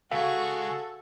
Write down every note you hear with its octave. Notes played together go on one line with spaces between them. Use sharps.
C#2 F#4 G#4 A4 F5 C#6